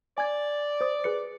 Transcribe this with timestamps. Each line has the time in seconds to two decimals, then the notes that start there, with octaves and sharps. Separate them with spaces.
0.18 D5 G#5 G#6
0.81 C5 D#6
1.04 G#4 B4 C#7